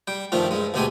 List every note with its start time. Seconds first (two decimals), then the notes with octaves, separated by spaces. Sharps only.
0.07 G3 G5
0.32 G2 D#3 F3 A3 F4
0.51 G2 G#3
0.74 D2 B2 G#3 A3 G4 G#5